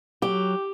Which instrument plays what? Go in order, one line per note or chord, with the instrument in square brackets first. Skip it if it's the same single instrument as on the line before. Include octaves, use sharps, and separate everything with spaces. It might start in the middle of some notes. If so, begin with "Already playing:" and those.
[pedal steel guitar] F#3 [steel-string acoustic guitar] G4